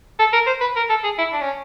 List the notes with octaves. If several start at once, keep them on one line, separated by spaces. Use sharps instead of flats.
A4
A#4
C5
B4
A#4
A4
G#4
E4
D4
C#4